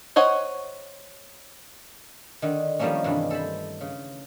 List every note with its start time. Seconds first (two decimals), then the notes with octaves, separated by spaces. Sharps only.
0.16 C5 C#5 D#5 F#5
2.42 D3 D#3
2.79 D#3 F3 G3 A3 A#3 C#4
3.04 G2 C3 D#3 E3
3.30 A4 C5 A5 B5
3.81 C#3